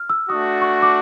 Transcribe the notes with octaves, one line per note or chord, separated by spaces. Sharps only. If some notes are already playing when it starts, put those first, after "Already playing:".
Already playing: F6
E6
A3 D4 F#4 D#6
C#6
D6